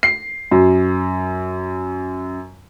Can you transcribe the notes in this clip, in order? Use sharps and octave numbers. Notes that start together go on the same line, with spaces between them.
C7
F#2